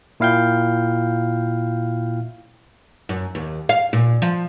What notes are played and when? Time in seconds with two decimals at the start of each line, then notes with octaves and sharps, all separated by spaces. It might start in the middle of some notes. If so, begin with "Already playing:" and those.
0.20 A#2 E4 F5 G5 G6
3.09 F#2
3.35 D#2
3.69 F5
3.93 A#2
4.22 F3